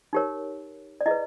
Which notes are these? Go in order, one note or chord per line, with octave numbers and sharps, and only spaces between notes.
D#4 G4 A#4 C#5
D5
E4 G#4 B4 D#5